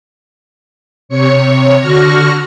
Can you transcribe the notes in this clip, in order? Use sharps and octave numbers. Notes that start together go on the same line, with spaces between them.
C3 C#5 C#7
D3 F#4 C#6 F6 A#6